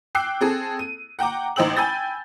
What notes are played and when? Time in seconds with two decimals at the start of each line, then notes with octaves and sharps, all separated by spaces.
0.15 G5 D6 E6 F#6 C7
0.41 C4 G#4 A4
0.79 D#7
1.19 F#5 G5 A#5 D6
1.56 A1 D#4 C5 G5 E6 F#7
1.76 G5 G#5 B5 E6 G6 A6